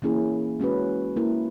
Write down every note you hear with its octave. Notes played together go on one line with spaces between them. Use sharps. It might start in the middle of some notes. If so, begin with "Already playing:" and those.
E3 A#3 C#4 E4 G#4
G#3 C#4 F#4 B4
A#3 E4 A#4